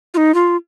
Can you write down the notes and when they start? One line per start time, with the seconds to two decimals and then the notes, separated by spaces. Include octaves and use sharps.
0.14 F4
0.17 D#4
0.34 F4